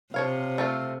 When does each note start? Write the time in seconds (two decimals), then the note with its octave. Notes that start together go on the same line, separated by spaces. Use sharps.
0.14 C3 F3 C#5 F5
0.58 A3 C4 F4